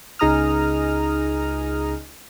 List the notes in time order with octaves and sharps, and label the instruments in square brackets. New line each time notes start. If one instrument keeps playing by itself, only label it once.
[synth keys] C#2 D#4 G#4 A#5 D#6 F6